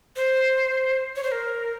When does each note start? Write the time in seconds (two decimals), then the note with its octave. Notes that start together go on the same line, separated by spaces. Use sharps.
0.16 C5
1.16 C#5
1.23 C5
1.32 A#4